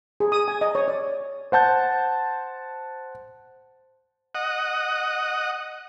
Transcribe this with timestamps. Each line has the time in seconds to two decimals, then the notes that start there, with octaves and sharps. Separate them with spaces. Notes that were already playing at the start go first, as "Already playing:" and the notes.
0.20 G#4
0.32 D#6
0.48 G#5
0.61 D#5
0.75 C#5
0.88 D5
1.52 C5 F#5 A5 G6
4.35 D#5 F#5